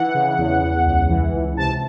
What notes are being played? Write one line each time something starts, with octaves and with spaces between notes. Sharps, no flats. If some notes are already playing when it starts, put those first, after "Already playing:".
Already playing: E3 F#5
C#3
E2
E2
C#2
E3
C#2
C3 A5